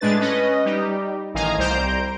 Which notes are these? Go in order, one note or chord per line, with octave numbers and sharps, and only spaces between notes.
A2 G#3 D4 B4 A6
C#4 B4 D#5
G3 D#4 G4
A1 D#3 D#5 F5 G#5 A#5
C2 G3 C5 A#5 G6 D7